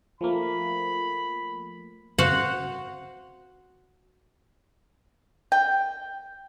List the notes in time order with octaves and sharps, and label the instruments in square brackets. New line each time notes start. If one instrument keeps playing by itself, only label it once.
[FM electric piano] F3 A3 A#3 [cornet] B5
[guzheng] F#4 C5 F5 F#5
[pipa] G5